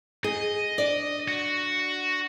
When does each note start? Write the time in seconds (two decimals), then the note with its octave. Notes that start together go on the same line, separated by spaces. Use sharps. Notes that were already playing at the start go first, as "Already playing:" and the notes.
0.24 G#4 D#5
0.78 D4 D5
1.28 F#4